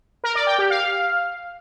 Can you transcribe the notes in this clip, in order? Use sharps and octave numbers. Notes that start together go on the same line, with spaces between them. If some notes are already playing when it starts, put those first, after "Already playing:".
A#4
D5
G5
G4
F5